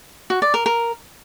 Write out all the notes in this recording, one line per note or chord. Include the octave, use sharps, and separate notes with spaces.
F#4
D5
A#4
A#4